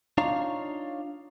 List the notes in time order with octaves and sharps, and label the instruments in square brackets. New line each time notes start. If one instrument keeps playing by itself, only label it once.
[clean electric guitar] D4 D#4 F4 C#5 F5 A#5